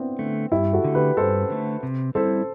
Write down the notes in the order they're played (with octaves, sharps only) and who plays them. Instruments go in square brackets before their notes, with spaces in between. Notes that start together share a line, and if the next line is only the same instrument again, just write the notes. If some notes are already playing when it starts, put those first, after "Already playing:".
Already playing: [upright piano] B3 C4 D4 E4
[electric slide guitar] D3 A3
[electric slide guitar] G2 [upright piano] E4 G4
[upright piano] F#4 A4
[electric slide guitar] D3 A3
[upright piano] G4 B4
[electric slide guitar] G2 [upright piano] A4 C5
[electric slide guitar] D3 A3
C3
[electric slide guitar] G3 C4 E4 [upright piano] A4 C5